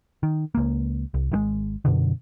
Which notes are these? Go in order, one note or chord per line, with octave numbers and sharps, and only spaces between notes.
D#3
C#2 A#3
C2
G#1 D#3 G#3
F#2 B2 D3